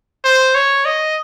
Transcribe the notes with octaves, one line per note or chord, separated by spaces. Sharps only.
C5
C#5
D#5